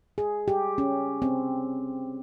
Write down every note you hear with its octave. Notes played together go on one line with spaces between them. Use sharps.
G#4
G4
C#4
C4